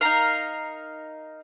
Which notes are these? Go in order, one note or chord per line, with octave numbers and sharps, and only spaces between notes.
D#4 A#4 F5